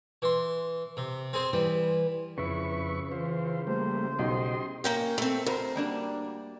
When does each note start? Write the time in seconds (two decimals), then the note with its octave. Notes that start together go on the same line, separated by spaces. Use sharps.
0.22 E3 C6
0.97 C3
1.33 C4 G#4 C5
1.53 E3 G3
2.38 F2 C#3 E4 B4 C#6
3.12 E3 F4 C5
3.67 G3 A3 A#3 C5
4.19 B1 G4 D#5 C6
4.84 A#3 C#4 G5
5.18 A3 C4
5.46 D2 A#4 C5
5.76 G3 A#3 D4